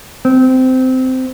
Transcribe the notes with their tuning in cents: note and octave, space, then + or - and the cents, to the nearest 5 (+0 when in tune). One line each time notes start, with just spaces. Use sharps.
C4 -15